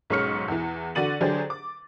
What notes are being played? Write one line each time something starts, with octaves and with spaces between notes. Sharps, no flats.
B1 G#2 C#4 C#6 F6 C#7
E2 E3
D3 F#4 D5 A6 D#7 F#7
D3 F#3 D4 G4 G#4 C5
D6